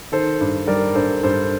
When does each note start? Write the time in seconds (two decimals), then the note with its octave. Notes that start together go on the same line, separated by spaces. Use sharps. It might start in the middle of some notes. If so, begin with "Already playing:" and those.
0.12 D#3 A4 C5
0.41 G2
0.67 G3 A#4 D5
0.95 G2 A4 C5
1.23 G2 A4 C5